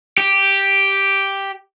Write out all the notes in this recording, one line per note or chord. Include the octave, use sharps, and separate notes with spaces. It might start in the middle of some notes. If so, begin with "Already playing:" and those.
G4